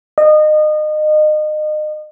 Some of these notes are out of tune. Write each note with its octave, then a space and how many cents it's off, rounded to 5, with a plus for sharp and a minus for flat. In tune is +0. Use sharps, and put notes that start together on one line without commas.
D#5 -30